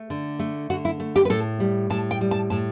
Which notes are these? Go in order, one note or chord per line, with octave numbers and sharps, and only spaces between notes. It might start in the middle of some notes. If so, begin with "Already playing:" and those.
Already playing: A3
D3
A3
D3 F#4
E4
A3
G4
B4
A2 A4
G3
A2 A5
G5
G3
A5
A2 A5